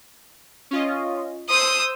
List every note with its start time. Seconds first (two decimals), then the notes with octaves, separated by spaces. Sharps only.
0.71 C#4 F4 D#5
1.50 C5 D#6 E6 G6